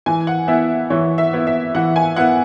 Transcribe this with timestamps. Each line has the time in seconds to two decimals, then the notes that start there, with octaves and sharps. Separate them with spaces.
0.06 E3 G#5
0.27 F#5
0.48 B3 E4 E5
0.90 E3 C#5
1.18 E5
1.33 B3 E4
1.47 E5
1.75 E3 F#5
1.96 G#5
2.16 B3 E4 F#5